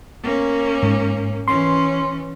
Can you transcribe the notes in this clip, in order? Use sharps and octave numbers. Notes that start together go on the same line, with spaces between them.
A#3 C#4
G#2
E3 C#4 C6